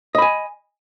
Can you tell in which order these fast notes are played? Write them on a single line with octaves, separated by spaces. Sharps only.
D#5 B5 G#5